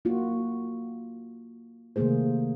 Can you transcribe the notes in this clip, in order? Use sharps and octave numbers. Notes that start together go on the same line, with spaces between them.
A#3 F4 F#4
C3 D#3 A3 A#3 G#4 C5